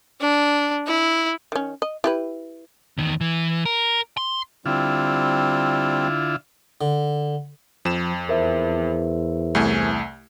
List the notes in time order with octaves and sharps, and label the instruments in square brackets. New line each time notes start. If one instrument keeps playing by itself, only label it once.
[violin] D4
E4
[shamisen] D#3 C#4
D#5
E4 G4 B4
[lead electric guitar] E2 D#3
E3
A#4
C6
[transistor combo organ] D3 E4 F4 [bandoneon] G3 C4
[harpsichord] D3
[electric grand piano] F2 E7 [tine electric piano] F3
[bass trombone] E2 [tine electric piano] A#4 C5 E5
[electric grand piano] C2 A3 G#5